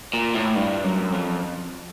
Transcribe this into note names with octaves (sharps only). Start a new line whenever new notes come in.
A#2
A2
G2
F#2
F2